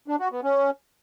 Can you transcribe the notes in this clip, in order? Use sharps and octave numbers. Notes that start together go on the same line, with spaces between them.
D4
F#4
B3
C#4